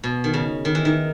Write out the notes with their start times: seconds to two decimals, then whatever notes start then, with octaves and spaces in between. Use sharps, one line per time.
0.04 B2
0.24 D#3
0.34 C#3
0.65 D#3
0.75 E3
0.85 D#3